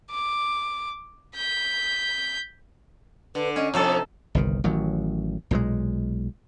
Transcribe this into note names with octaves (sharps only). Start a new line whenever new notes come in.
D6
G6 B6
D3 B4
C#4 D#5
F2 C3 D#4 A4 C#5
C5
G1 C2 D#3
A1 D#3 F#3
B1 A#2 D3 G#3